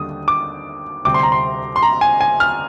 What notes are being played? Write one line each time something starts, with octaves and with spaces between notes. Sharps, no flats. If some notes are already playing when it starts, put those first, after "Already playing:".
Already playing: D#2 D3 G3 D#6
D6
D2 C3 G3 C4 D6
C6
A#5
C6
C6
A#5
G#5
G#5
F6